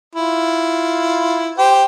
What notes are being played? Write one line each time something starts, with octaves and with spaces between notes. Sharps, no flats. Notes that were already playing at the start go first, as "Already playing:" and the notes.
E4 F4
G4 C5 G5